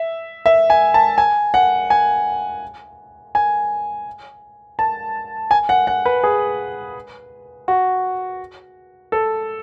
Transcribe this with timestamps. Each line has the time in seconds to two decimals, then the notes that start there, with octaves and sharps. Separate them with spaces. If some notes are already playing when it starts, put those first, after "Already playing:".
Already playing: E5
0.46 E5
0.70 G#5
0.94 A5
1.18 G#5
1.54 F#5
1.90 G#5
3.35 G#5
4.79 A5
5.51 G#5
5.69 F#5
5.87 F#5
6.05 B4
6.23 G#4
7.68 F#4
9.12 A4